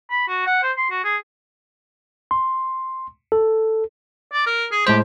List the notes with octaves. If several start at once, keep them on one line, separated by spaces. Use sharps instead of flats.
B5
F#4
F#5
C5
C6
F#4
G#4
C6
A4
D5
A#4
G#4
A2 G#3 G4 C5